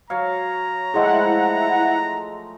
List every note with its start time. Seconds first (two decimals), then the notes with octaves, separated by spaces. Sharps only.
0.10 F#3 C#5 F5 A#5
0.94 F3 G#3 A3 E4 G#4 D#5 F#5 G5